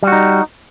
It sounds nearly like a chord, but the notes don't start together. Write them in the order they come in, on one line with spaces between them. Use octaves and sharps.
G3 F#4 D#4